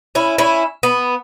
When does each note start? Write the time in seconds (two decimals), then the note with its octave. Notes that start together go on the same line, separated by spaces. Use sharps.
0.15 C#4 E4
0.38 C#4 E4
0.83 B3